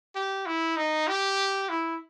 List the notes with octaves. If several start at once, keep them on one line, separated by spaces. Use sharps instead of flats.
G4
E4
D#4
G4
E4